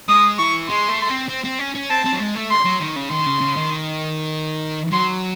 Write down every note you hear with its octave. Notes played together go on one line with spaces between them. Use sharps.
G#3 D#6
E3 C#6
G#3 C6
A3
C4
C4
C4
C#4
C#4
C4 A5
C4
F#3
G#3
A3
C6
F#3
D#3
C#3
D#3 C6
C#3
C#3
D#3
F#3 C6